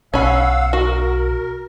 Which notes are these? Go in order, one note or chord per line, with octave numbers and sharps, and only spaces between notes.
B1 C#4 F5 F#5 B5 E6
F#4 A#4